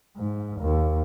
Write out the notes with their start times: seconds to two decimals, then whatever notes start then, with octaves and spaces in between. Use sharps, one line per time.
0.17 G#2
0.61 D#2